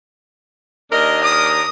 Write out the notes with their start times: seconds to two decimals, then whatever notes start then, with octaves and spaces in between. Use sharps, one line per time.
0.92 D#2 D4 A#4 D#5
1.23 D#6